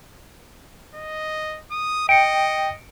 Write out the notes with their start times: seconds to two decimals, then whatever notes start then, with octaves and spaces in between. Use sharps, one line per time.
0.95 D#5
1.71 D#6
2.09 D#5 G5 C#7 D7